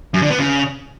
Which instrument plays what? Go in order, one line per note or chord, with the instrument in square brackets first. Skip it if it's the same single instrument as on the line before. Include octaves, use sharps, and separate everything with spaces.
[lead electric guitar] F#2
D3
B3
C#3